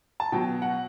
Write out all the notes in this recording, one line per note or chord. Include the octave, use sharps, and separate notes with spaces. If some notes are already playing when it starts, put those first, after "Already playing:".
A5
B2 F#3 G5
F#5